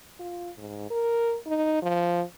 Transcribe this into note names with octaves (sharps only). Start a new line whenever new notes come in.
F4
G#2
A#4
D#4
F3